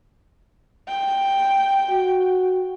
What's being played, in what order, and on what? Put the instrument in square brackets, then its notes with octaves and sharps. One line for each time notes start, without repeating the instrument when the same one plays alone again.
[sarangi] G5
[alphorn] F#4